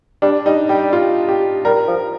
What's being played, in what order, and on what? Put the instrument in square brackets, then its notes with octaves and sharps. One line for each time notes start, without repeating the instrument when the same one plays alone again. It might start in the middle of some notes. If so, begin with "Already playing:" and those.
[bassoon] G3 [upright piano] D4
[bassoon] G3 [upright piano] D#4
[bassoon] G3 [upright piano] G4
[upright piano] F4
G4
[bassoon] G3 [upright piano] A#4
[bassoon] F3